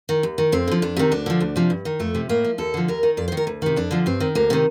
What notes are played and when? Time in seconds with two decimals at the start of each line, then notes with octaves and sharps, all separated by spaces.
0.09 D#3
0.23 D#2
0.38 D#3
0.52 F2 C4
0.68 D3 F3
0.82 F2 D4
0.97 C3 D#3
1.12 D2 D4
1.26 D3 F3
1.41 D2
1.56 C3 F3
1.70 G2
1.85 D#3
1.99 F2 A3
2.15 C3 F3
2.29 A2 A#3
2.45 F3
2.58 D#2 A4
2.74 D3 F3
2.88 D#2 A#4
3.03 D#3
3.17 F2 D5
3.28 C5
3.32 D#3
3.37 A#4
3.47 D2
3.62 C3 D#3
3.76 F2 D4
3.91 D3 F3
4.06 G2 C4
4.20 D#3
4.35 D2 A#3
4.50 C3 D#3